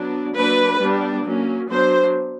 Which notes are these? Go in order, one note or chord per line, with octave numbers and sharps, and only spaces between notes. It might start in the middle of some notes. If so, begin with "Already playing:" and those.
Already playing: F#3 B3 D4
F#3 A#3 D4 B4
G3 B3 D4
F#3 A#3 C#4
F#3 B3 D4 C5